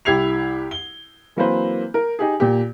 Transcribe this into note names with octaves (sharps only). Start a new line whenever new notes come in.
C2 E4 G4 G#6 C7 F7
G7
E3 F#3 A#3 C4 B4 C5
A#4
D#4 G4 G#4
A#2 G4